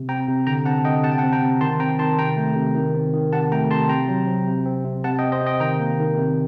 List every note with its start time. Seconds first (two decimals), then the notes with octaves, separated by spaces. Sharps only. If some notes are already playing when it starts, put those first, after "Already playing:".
Already playing: C3
0.09 C4 G5 A#5
0.28 C3
0.47 D3 G5 A#5
0.66 C4 F#5 A5
0.85 D3 D#5 G5
1.03 C3 F#5 A5
1.12 G5
1.18 F#5 A5
1.23 C4
1.33 G5 A#5
1.42 C3
1.61 D#3 A5 C6
1.80 C4 G5 A#5
1.99 D#3 A5 C6
2.18 C3 G5 A#5
2.37 A3
2.56 C3
2.75 D#3
2.95 C4
3.13 D#3
3.32 C3 F#5 A5
3.52 A3 G5 A#5
3.71 C3 A5 C6
3.89 C3 G5 A#5
4.08 F#3
4.27 C4
4.47 C3
4.66 C4
4.84 C3
5.04 C3 F#5 A5
5.19 D#5 G5
5.22 C4
5.32 C5 D#5
5.41 C3
5.46 D#5 G5
5.60 D#3 G5 A#5
5.80 A#3
5.99 D#3
6.17 C3